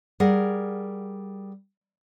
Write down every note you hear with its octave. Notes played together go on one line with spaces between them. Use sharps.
G3 G#4 A#4 F#5